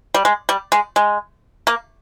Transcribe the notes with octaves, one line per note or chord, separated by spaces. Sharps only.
G3
G#3
G3
G#3
G#3
A#3